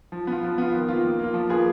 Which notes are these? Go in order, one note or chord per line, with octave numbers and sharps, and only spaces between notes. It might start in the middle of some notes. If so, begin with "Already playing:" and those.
F3
B3 F4
F3
B3 F4
D#3
A#3 F4
D#3
A#3 F4
F3
A#3 F4 G#4 B4